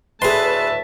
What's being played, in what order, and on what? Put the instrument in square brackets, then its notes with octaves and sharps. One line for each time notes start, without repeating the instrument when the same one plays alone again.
[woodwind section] D2 A2 E5 [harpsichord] G#4 C6 [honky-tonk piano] B4 [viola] A5